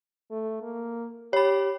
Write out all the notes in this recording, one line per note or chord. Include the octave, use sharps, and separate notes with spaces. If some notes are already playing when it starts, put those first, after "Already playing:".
A3
A#3
G4 C#5 B5